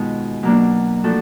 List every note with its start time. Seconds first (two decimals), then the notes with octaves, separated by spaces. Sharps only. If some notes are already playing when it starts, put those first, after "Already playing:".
Already playing: B2 D#3 G#3 B3 D#4 F4
0.43 B2 F#3 A#3 D4
1.03 F3 A3 D4 F#4 A4